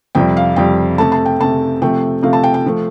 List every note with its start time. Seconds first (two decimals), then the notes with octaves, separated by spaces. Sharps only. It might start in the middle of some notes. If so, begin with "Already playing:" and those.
0.15 F2 C3 G3 G5
0.37 F5
0.56 F2 C3 G3 G5
0.98 C3 A3 A5
1.12 A5
1.26 G5
1.40 C3 A3 A5
1.81 C3 F3 A3 G5
2.23 C3 F3 A3 F5
2.33 A5
2.44 G5
2.54 G5
2.66 F3 A3